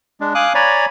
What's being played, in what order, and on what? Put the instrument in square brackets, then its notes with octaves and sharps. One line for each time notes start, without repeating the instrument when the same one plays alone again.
[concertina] G#3 D4
F5 G#5 D6 D#6 F#6
C#5 D5 G#5 A#5 B5